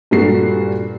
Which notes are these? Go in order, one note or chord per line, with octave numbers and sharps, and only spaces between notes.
G2 A#2 A#3 F#4 A4 C7